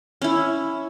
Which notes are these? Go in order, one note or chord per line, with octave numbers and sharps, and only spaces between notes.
C#4 E4